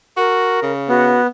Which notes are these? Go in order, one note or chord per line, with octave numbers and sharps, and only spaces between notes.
F#4 A#4
C#3
B3 F#4